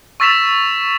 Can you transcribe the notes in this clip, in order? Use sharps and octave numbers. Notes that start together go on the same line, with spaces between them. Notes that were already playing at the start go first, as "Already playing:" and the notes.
C#6 E6 A6 B6 E7 F7